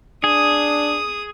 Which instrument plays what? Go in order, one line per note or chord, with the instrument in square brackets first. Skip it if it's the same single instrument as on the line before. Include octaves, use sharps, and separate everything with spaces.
[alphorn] D4 [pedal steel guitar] G#4 [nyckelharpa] D#6